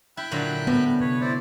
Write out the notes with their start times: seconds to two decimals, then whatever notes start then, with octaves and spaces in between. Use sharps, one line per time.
0.17 E4 G5 B5 F#6
0.31 A#2 D3 F#3
0.67 A2 B3 B4
1.00 C3 B4 C#5
1.21 E4 C5 D5